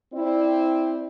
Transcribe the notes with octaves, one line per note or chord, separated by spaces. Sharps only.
C4 E4 D5